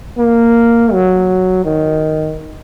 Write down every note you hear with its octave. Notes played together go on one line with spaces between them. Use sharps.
A#3
F#3
D#3